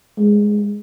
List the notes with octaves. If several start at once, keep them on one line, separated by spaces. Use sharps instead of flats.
G#3